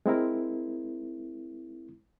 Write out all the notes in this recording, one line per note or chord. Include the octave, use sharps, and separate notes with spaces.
G#3 C4 E4 A#4